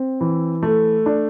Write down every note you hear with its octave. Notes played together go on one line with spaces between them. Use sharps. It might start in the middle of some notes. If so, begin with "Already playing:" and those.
Already playing: C4
E3
A3
D4